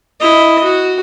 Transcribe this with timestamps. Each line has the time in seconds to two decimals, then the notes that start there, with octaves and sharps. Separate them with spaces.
0.20 E4 D#5
0.63 F#4